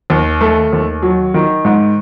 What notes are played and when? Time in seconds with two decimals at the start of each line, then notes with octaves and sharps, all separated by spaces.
0.10 D#2
0.41 A3
0.73 D#2
1.02 F#3
1.34 D#3
1.65 G#2